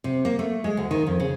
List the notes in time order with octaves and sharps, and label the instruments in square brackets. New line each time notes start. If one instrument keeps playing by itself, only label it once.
[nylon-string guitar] C3
A#3
A3
G#3
D2
D#3
F2
C#3